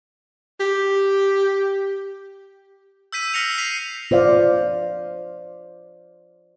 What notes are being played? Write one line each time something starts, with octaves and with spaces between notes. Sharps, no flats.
G4
E6 G6 B6 D#7
E6 F6 A#6 C7 C#7 F7
B6 C7 D#7 F7
F4 C5 D5 F5